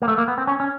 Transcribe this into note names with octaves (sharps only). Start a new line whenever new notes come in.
A#3
A3
A#3
B3
C4
C#4
C#4